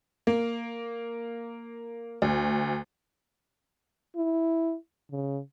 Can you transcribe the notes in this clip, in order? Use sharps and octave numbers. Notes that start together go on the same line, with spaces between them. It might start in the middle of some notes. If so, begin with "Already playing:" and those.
A#3
D2
E4
C#3